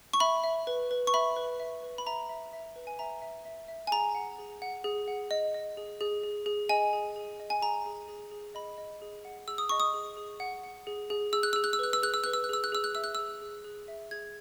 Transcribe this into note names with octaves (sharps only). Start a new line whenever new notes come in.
C#6
E5 B5
E5
B4
B4
C#6
E5 B5
B4
E5
B4
B5
E5 A#5
E5
E5
B4
G#5
E5 A#5
E5
E5
E5
G#5
G#4 A#5
F#5
G#4
F#5
G#4
F#5
D#5
D#5
G#4
G#4
G#4
G#4
D#5 G#5
G#4
G#4
D#5
G#5
G#4 A#5
G#4
G#4
G#4
D#5 B5
D#5
G#4
F#5
G#4 E6
D#6
D#5 C#6
D#6
G#4
G#4
F#5
F#5
G#4
G#4
G#4 E6
F#6
G#4 E6
F#6
E6
B4 F#6
E6
G#4 F#6
E6
B4 F#6
E6
F#6
G#4 E6
F#6
G#4 E6
F#6
E5 E6
F#6
G#4 E6
G#4
G#4
E5
G#4 G#6